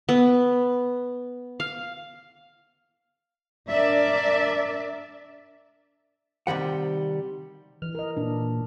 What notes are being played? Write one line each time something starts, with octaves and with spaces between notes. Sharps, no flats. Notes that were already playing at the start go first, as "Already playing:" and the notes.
B3
F5
D4 A#4 D5 E5
C3 D#3 G3 F#5
E3 F6
A#4 D#5
A#2 D4